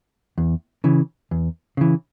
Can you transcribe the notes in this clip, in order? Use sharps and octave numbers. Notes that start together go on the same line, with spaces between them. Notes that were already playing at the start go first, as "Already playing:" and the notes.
E2
C#3 E3
E2
C#3 E3